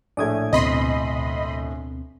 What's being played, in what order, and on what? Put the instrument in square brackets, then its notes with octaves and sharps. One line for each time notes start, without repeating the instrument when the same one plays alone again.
[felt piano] A#1 A2 A3 [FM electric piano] D5 D#6 G#6
[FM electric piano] D2 B2 C4 [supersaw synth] D#5 B5 C6